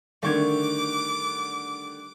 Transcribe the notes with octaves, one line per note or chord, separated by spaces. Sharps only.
D3 D#3 G3 A3 C#6 D6 G#6